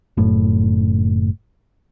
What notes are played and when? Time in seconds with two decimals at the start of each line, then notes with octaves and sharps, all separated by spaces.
0.17 F#1 A2